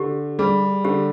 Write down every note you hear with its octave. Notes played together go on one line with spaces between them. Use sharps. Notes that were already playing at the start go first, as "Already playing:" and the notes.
Already playing: D3 G4
G3 G#4
D3 G4